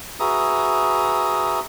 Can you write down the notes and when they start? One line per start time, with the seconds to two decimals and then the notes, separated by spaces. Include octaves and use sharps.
0.20 F#4 G#4 B4 E5 A#5 D#6